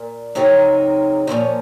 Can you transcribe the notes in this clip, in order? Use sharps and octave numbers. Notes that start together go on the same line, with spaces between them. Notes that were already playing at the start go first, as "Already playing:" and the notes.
Already playing: A#2
C#3 F#3 C4 D#4 A#4
A#2 F3 C4 D#4 C#5